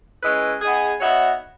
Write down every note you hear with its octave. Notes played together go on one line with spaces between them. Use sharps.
G#3 C#4 E4 B4 D#5
B3 D#4 G#4
B3 D#4 F#4 C#5 E5